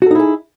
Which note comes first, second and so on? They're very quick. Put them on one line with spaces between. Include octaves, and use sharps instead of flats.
F#4 A4 D#4 E4 G#4